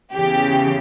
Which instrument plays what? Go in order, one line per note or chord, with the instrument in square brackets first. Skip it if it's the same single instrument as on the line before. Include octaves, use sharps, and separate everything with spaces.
[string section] E2 C#3 E3 G4